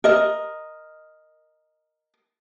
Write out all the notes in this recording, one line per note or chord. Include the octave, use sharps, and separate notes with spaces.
A#4 D#5